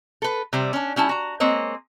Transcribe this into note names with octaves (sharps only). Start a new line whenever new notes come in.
A4 B4
C3 G3 C5
C#4 D4
G3 C#4 E4 A5
F#4 A#5
G#3 A#3 C4 C#5 D#5